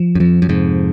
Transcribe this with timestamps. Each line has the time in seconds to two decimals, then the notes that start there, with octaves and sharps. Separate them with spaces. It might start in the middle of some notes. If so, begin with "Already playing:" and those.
Already playing: F3
0.15 F#2
0.20 F2 F3
0.42 F#2
0.49 F2 G#2 C3